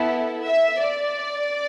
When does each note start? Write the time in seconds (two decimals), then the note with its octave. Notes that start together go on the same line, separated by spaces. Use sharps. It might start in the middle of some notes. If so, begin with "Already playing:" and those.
Already playing: B3 E4 A4
0.45 E5
0.80 D5